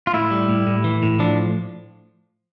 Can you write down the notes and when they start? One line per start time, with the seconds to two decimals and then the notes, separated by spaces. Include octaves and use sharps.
0.07 F4
0.13 A2 E4
0.31 G3
0.49 A2
0.67 A2
0.84 E3
1.03 A2
1.19 F3 D4